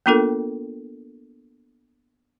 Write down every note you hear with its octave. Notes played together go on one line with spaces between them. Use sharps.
A#3 B3 D4 F4 A4 A#4